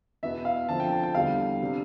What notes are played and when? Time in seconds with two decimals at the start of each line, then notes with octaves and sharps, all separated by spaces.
0.23 E2 B2 B3 E5
0.45 F5
0.68 D3 F3 C4 A5
0.80 G5
0.92 A5
1.03 G5
1.15 E2 D3 G3 F5
1.61 C3 G3 D4